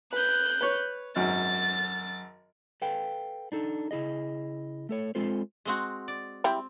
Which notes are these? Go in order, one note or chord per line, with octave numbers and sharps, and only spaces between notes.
B4 F#6 G6
B4 C#5
G#1 F#2 A6
A4 B4 F5 G5
D4 D#4 A4
C#3 E4 G#4 D#5
A3 A4 C#5
G#3 C4 F4 A4 C5
G#3 C4 F#4
D5
G3 C4 E4 G5